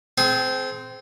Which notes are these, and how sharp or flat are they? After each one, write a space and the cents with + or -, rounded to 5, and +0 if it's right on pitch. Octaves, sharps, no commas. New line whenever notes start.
C4 -15 G#4 +35